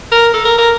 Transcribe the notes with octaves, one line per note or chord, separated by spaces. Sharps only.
A#4
A4
A#4
A#4